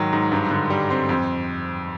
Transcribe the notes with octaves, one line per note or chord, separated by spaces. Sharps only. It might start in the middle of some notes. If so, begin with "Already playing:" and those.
Already playing: G#2 D#3 F#3
G#2
G2
D3
G3
C4
F2